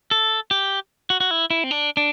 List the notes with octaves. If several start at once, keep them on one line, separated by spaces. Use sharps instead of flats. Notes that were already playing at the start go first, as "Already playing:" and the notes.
A4
G4
F#4
F#4
E4
E4
C4
D4
D4